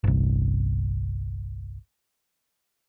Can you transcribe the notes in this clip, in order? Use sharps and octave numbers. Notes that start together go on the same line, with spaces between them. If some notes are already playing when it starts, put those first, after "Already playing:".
G1 C2